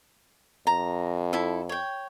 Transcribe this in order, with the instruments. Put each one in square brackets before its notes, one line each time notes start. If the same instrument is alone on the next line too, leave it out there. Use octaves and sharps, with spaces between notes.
[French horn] F2 [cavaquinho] A#5
[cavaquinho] E4 A4
C#5 G5